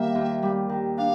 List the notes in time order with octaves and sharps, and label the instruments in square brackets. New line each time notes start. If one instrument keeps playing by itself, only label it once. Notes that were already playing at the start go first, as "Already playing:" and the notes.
Already playing: [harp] D#3 G3 A#3 [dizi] E5
[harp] D#2
G3
D#3
[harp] D4 [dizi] F5